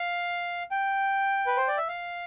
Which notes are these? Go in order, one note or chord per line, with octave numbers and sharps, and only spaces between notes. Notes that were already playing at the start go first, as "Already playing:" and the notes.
Already playing: F5
G5
B4
C5
D5
E5
F5